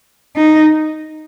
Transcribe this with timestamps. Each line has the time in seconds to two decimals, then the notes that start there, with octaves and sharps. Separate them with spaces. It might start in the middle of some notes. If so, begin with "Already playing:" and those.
0.36 D#4